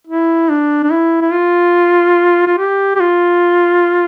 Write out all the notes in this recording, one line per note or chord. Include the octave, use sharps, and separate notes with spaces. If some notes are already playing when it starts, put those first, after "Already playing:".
E4
D4
D4
E4
E4
F4
F4
G4
G4
F4